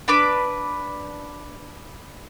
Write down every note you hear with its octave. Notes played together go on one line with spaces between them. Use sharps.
D4 B4 D6